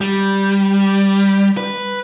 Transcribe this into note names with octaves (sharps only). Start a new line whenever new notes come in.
G3
B4